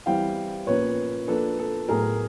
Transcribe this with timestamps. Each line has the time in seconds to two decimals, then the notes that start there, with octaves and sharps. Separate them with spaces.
0.06 E3 G3 C4 E4 F5 G5
0.67 A#2 F3 A#3 C#4 B4 C#5
1.27 F3 A#3 D4 A4 B4
1.59 A4
1.89 A2 F#3 B3 G#4 A#4